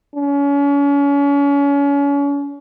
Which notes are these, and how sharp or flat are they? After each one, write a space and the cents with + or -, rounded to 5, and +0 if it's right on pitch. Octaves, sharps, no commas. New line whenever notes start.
C#4 +35